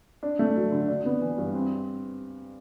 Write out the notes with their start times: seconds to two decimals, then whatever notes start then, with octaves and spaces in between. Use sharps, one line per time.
0.23 D4
0.39 A3
0.56 F#3
0.72 D3
0.88 D4
1.05 B3
1.21 E3
1.38 G2
1.53 C4